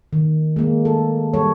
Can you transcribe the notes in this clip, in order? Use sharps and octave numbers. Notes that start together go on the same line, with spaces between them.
D#3
G#3 A#3
A4
G3 A4 C#5